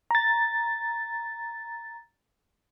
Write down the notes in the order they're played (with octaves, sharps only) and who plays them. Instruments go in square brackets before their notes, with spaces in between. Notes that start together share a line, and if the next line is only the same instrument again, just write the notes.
[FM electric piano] A#5 A6